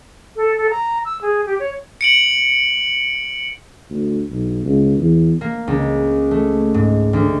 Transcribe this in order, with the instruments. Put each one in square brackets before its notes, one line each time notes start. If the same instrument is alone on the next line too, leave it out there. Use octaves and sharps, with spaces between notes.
[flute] A4
A4
A#5
E6
G#4
G4
C#5
[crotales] C#7 D7 F#7
[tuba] D2
B1
C#2
E2
[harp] A#3
C#2
A3
G#2
D2